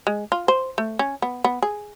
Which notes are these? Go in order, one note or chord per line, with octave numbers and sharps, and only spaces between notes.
G#3
F4
C5
A3
C#4
B3
B3
G#4